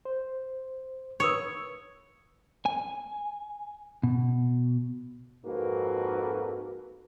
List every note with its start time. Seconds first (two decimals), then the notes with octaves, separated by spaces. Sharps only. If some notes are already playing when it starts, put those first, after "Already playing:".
0.05 C5
1.20 B4 C#5 D#6 E6
2.66 G#5
4.03 B2
5.45 F2 G#2 A#3 F#4 A4 B4